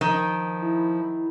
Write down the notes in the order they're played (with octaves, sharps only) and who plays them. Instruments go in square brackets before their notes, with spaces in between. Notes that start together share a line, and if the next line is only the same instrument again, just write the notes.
[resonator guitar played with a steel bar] D#3 [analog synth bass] F3
[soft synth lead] E4